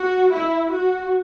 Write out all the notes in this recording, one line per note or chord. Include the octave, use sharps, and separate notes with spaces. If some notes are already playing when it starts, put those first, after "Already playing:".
Already playing: F#4
E4
F#4